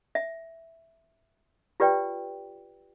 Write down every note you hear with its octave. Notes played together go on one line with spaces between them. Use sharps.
E5
F4 G4 B4 D5 G5